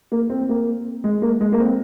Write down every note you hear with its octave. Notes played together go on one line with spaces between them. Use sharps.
A#3
C4
C4
A#3
G#3
A#3
G#3
A#3
C4